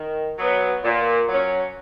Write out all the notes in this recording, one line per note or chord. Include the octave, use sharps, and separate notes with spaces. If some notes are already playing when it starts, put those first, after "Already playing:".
Already playing: D#3
F#3 B3
A#2
F#3 C#4